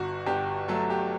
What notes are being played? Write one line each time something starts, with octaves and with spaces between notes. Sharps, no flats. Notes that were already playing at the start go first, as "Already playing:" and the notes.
Already playing: G1 F#4
G1 G4
F#3 A3 A4
G4